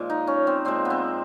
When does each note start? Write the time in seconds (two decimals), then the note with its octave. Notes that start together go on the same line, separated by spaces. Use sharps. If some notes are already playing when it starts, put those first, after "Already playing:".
Already playing: A#2 F3 G#3
0.10 D#4
0.27 C#4
0.47 C4
0.65 A#2 F3 G#3 C4
0.85 B3
0.90 C4